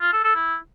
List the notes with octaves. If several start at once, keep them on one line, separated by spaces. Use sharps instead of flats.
F4
A4
A4
E4